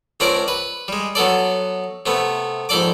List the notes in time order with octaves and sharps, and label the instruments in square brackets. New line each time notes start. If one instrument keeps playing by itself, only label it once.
[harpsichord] C#2 C4 D4 A#4 C#5 D5
B4
G3 G#3
F#3 B3 A4 D5
C3 A3 B3
A#1 G#2 A4 D5 D6